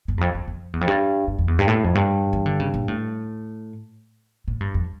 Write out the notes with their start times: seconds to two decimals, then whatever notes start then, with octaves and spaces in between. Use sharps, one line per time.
0.08 G2
0.18 E2
0.21 F2
0.35 F2
0.48 F2
0.73 E2
0.81 F2
0.88 G2
1.27 G2
1.39 F2
1.48 E2
1.59 G2
1.68 A2
1.84 F2
1.95 G2
2.33 E3
2.46 D3
2.60 C#3
2.74 A#2
2.88 A2
4.48 A2
4.60 G2
4.74 F2